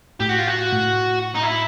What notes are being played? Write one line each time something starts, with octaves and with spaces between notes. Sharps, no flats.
A2 G4
F#4
F4
F#4
A2
D#4
E4